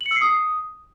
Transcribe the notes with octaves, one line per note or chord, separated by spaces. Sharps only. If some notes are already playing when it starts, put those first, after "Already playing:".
F#7
C#7
E6
C7
D#6